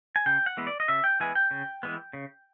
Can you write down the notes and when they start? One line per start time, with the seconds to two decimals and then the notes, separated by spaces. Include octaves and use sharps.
0.16 G#5
0.26 C#3 G5
0.46 F#5
0.57 E3 G#3 B3
0.67 D5
0.80 D#5
0.88 C#3 E5
1.04 G5
1.20 E3 G#3 B3 G#5
1.35 G5
1.51 C#3
1.83 E3 G#3 B3
2.13 C#3